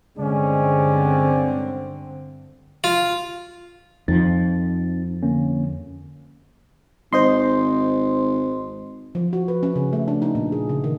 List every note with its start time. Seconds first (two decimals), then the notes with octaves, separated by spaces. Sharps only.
0.18 G2 D3 G#3 C4 C#4 D5
2.84 F4
4.08 F2 F3 C4 D#4 A6
5.23 D3 A#3 C#4
7.13 G#1 C5 D#5 C6
9.15 F3
9.33 F#4
9.48 B4
9.63 C#4
9.76 C#3
9.93 A3
10.08 D4
10.22 D#4
10.35 A#2
10.52 G#4
10.69 C#3
10.84 D#3